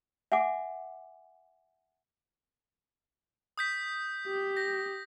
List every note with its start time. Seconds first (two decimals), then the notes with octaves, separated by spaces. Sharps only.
0.32 E5 F#5 G#5 D6
3.58 D#6 G6 B6
4.27 G4
4.57 A#6